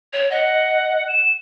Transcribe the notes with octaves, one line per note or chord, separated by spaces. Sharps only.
C#5
D#5 F#5
E7